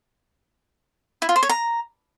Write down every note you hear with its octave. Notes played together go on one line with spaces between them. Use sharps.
E4
F4
C5
C#5
A#5